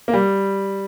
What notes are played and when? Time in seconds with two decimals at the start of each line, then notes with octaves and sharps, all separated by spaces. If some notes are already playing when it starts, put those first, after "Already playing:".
0.08 A#3
0.13 G3